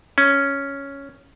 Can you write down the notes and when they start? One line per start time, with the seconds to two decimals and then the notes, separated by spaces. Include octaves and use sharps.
0.18 C#4